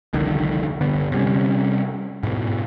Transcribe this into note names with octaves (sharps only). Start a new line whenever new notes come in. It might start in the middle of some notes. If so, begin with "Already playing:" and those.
F1 C2 D3 D#3
G1 D3 B3
C3 G3 C#4
G#2 B2